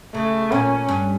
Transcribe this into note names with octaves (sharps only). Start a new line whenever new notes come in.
C#3 A3
A#2 C#4
G2